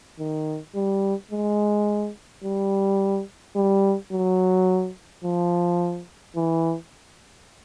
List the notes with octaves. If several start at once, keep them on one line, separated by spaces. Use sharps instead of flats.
D#3
G3
G#3
G3
G3
F#3
F3
E3